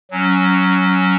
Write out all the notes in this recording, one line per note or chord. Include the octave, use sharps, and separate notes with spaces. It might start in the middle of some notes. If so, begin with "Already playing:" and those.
F#3 C#4